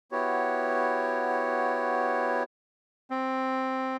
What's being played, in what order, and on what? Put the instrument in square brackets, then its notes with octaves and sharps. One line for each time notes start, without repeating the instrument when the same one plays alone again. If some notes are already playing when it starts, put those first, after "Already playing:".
[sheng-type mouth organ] B3 E4 F#4 G4 C#5
[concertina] C4